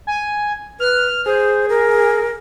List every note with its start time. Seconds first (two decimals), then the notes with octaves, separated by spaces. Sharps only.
0.07 G#5
0.80 B4 F6
1.26 G#4 C5
1.69 A#4